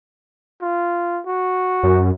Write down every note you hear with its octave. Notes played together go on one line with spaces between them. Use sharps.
F4
F#4
F#2